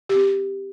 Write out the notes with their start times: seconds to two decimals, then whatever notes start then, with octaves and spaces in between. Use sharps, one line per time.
0.09 G4
0.15 C4